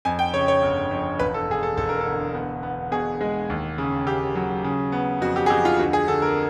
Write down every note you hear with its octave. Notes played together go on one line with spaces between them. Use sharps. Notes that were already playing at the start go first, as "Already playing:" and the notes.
F2 G#5
G5
C#3 C#5
C#5
G1
F2
E1 B4
A4
E1 G#4
A4
E1 A4
A#4
A4
D2
B3
B3
B2 G#4
G#3
D#2
C#3
C#3 G4
F#3
C#3
B3
F2 F#4
G4
G#4
F2 G4
F4
D2 F#4
G#4
D3 A4
A#4